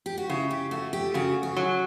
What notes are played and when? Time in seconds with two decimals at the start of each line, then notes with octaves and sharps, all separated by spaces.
0.06 G4
0.18 F#4
0.29 C#3 E4
0.51 G4
0.71 A3 F#4
0.93 G4
1.14 C#3 F#4
1.43 F#4
1.56 F#3